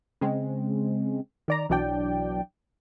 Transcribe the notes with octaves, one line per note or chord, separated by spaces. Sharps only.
C#3 G#3 C4
D#3 D5 A#5
B1 E3 F#3 D4 D5 G5